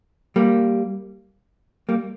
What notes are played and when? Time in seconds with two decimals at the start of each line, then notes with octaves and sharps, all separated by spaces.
0.36 G3 A#3
1.89 G3 A#3